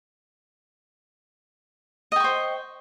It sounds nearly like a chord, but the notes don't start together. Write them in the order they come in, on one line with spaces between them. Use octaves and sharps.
D#5 G5 C#6 C5